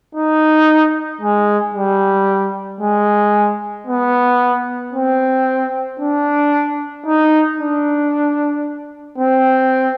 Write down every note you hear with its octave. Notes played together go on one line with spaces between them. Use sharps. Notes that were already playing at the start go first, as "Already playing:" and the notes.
D#4
G#3
G3
G#3
B3
C4
D4
D#4
D4
C4